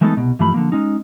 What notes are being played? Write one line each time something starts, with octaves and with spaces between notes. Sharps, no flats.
E3 G#3 A3 B3 D#4 A4
C2 B2
G2 E3 F3 A3 B5
D3 F3 A#3
G#3 C#4 D#4